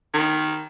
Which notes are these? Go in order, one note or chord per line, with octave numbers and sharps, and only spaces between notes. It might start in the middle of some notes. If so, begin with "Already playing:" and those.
D#3